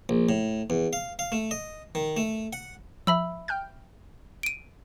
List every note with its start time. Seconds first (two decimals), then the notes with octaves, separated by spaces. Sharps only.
0.09 A#1
0.29 A2
0.70 E2
0.93 F5
1.19 F5
1.32 A3
1.51 D#5
1.95 D#3
2.17 A3
2.53 F#5
3.07 F3 E5 B5 E6
3.48 G5 F6 G6
4.43 D7 D#7